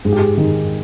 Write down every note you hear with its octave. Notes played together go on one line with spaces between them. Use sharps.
G#2 G#4
G4
G#4
D#3 G#3